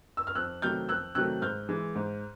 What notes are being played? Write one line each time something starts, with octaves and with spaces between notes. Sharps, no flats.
E6
F6
F2 E6 F#6
C3 D#3 F#3 A3 F6 G6
F2 E6 F#6
C3 D#3 F#3 A3 E6 F#6
G#2 F6 G6
E3 G#3
G#2